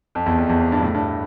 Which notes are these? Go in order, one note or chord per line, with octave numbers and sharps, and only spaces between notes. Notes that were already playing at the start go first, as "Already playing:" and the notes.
F2
E2
F2
E2
F2
G2
A2
G2